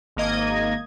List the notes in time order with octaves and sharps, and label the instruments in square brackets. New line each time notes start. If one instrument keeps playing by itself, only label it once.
[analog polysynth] G#1 A#3 D#5 G#6